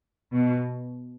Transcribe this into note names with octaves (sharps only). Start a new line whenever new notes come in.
B2